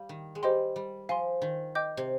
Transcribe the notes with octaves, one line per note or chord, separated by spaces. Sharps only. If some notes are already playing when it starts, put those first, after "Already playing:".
Already playing: G3 F5
D#3
G#3
G3 G4 C5 D#5 G5 C6
G3
F3 F5 G#5 C6
D#3
D#5 G5 D6 G6
C3